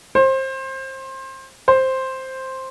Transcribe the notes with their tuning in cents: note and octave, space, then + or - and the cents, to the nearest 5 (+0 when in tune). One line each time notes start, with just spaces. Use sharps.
C5 +25
C5 +5